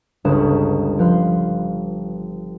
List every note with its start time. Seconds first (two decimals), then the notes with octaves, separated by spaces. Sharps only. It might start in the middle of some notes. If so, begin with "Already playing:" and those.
0.25 G1 C#2 C#4 B4 D#6 E7
0.99 F3 B4 F5 C6